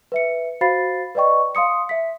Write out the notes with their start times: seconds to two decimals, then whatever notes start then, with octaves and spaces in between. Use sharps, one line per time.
0.12 B4 E5 C#7
0.61 F#4 C5 F5 B5 A6 C7
1.15 B4 D5 D#5 G5 C#6
1.55 F5 C6 D#6 C#7
1.89 E5 B6